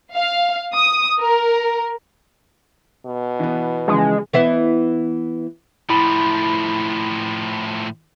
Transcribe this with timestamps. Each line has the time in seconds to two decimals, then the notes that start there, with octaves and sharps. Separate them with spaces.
0.14 F5
0.73 D#6
1.20 A#4
3.06 B2
3.39 E3 B3
3.88 C#3 E3 F3 G#3
4.33 E3 B3 E4
5.90 A2 F3 E4 B5